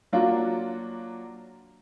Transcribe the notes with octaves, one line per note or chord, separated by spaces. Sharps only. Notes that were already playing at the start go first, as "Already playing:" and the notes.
F#3 A#3 D4 F4 F#4